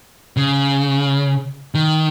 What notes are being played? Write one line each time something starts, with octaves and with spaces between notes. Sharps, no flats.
C#3
D#3